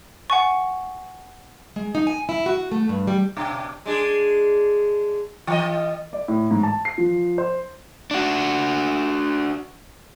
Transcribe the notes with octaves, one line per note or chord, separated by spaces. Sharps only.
F#5 G#5 C#6
G#3
D#4
G#5
E4
F#4
A3
G2
G3
B2 D4
G#3 D4 G#4
E3 D#5
D5
A2
G#2
A5
C7
F3
C5
D4 F#4